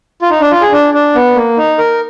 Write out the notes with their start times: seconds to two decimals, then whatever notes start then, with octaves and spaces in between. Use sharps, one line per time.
0.22 F4
0.30 D#4
0.41 D4
0.51 F4
0.62 G#4
0.72 D4
0.94 D4
1.15 B3
1.35 A#3
1.57 D#4
1.78 A#4